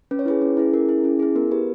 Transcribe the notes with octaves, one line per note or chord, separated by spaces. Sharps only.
C#4 B4
C#5
E4 G#4 B4
C#4
E4 G#4
C#4 A#4
E4 G#4
C#4
E4 G#4
B3 A#4
G4 B4